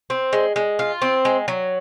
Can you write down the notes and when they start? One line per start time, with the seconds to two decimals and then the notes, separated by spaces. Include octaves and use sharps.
0.10 C4
0.33 G#3
0.56 G#3
0.79 F4
1.02 C4
1.25 G#3
1.48 F#3